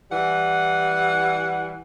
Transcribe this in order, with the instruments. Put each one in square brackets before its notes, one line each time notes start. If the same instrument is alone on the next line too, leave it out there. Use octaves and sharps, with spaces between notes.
[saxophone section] E3 G3 F#5